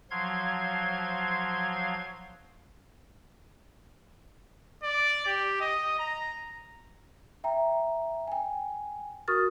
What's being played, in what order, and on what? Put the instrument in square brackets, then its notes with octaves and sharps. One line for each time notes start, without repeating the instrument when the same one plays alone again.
[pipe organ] F3 F#3 F5 C6 G#6
[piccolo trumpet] D5
G4
D#5
A#5
[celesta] E5 G5 A#5
G5 G#5
F#4 A#4 C#6 D#6 F6 A6